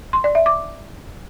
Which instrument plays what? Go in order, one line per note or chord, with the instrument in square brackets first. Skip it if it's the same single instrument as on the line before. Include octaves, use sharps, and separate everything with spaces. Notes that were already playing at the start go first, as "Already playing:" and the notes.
[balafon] C6
D5
E5
D6